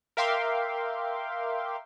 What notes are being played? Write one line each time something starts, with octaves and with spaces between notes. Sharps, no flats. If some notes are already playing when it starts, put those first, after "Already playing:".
A#4 E5 F5 G5 C6 D6